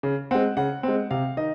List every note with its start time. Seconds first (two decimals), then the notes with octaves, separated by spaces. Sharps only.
0.03 C#3
0.31 G#3 C4 F#5
0.57 C#3 F#5
0.83 G#3 C4
1.11 C3 F5
1.37 D#3 D#5